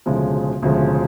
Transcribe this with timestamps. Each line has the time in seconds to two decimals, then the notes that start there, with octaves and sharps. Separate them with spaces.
0.06 E1 D2 C#3 F3 G#3
0.62 E1 D2 C#3 F3 G#3